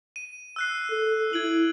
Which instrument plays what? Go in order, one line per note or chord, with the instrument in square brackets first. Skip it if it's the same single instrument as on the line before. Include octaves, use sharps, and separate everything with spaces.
[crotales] D#7
E6 F#6 C7
[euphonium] A4
[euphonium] E4 [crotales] G#6 D7 F#7